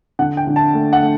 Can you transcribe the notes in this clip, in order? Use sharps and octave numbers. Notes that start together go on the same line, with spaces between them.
D3 F#5
G5
D3
A5
A3
F#5
A3